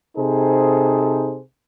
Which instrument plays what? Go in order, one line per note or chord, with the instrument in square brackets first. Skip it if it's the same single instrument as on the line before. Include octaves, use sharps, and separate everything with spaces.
[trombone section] C3 D#4 G#4 A4 C5